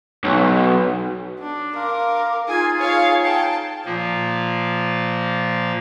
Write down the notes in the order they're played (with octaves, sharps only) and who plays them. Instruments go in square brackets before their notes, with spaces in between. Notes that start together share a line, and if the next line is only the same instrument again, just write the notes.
[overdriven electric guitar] B1
[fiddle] D4
[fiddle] A#4 [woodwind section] F5 C6 D6
[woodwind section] D#4 F4 G#4 [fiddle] G#5
[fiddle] C#5 F5
G5 A5
[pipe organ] A#2 F3 A#3